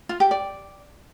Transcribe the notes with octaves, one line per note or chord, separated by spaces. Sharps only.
F4
G4
D5